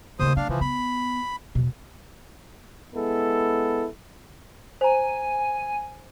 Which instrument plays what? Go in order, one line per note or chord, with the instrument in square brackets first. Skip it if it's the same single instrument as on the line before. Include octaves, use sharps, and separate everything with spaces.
[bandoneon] D#2 C5 D#6 [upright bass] C#3 A3
[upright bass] A3 [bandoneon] D4 F5
[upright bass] C#3 [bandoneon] E3 F3
[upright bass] B3 [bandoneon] B5
[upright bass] E2 B2
[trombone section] G#3 B3 E4 A4
[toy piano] C5 A#5 [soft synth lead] G#5